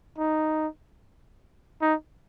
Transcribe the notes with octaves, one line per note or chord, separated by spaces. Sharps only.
D#4
D#4